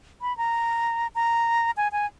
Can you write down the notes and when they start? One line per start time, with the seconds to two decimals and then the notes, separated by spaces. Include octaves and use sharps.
0.22 B5
0.37 A#5
1.15 A#5
1.77 G#5
1.92 G#5